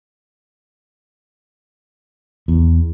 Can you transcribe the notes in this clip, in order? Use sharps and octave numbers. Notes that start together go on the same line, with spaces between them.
E2